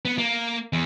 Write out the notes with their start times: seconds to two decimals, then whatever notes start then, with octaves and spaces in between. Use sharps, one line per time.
0.05 B3
0.18 A#3
0.73 E2